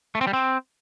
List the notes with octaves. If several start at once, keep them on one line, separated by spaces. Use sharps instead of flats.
A3
C4
G3
C4